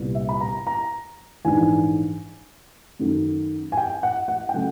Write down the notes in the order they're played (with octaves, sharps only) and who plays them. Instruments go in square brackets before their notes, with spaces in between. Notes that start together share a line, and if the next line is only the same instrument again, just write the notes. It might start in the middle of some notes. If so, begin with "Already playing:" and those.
Already playing: [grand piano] C2 A#2 G3 B3
E5
B5
A#5
A#5
A#1 G#2 E3 G#5
F#2 D#3 F#3 A3
G#5
G5
F#5
F#5
G5
C#3 F#3 A3 F#5